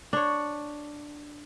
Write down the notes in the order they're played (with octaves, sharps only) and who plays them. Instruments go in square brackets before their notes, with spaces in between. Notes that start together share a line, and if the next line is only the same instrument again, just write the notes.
[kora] D4 C#5